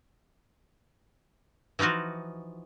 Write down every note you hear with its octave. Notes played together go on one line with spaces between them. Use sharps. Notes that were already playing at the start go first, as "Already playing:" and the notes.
E3 F3 D#4 F4 F#4